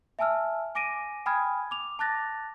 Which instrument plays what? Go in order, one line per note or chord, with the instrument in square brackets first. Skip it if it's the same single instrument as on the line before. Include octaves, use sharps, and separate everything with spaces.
[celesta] E5 G#5 A5 E6 F6
G#5 D6 A#6 D7 D#7
G5 G#5 B5 D#6 F6 G#6
D6 F7
A5 D6 F#6 A6 A#6